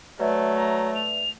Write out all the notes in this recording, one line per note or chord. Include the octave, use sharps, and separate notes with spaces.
F#3 A3 B4 D5 E5
A#5
F7